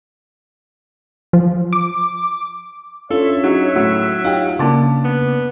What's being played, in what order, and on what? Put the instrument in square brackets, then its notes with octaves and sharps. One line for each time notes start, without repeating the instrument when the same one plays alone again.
[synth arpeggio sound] F3
D6
[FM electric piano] C#4 D4 [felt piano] F4 [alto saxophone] A4 [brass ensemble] C#5 E5
[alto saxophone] F#3 [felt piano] D#4 F#4 G#4
[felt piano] A2 [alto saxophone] F#3
[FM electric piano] D#4 F4 G4 [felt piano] F5 G5
[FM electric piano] C#3 A#3 [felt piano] D4 A5 D6
[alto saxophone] B3